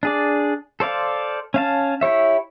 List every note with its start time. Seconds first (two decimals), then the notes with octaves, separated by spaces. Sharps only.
0.03 D4 G#4 D5
0.80 A4 C5 D5 F5
1.54 C#4 F5 A5
2.01 E4 G4 C#5 E5